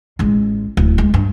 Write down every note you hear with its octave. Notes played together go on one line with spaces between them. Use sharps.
A1 G#3
D1
G#3
G2